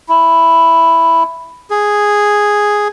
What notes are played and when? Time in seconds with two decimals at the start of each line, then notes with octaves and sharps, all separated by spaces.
0.09 E4
1.70 G#4